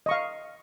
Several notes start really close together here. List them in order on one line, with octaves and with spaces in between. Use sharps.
D#5 C#6 F5